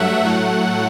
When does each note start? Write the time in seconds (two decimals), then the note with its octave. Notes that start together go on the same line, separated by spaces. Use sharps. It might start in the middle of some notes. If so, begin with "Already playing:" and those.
Already playing: G2 F#3 A3 E5 F#5
0.25 A2 F#3 A3